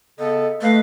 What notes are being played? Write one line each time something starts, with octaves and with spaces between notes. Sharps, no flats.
C#3 B3 A4 D#5
A3 B4 D#5 F5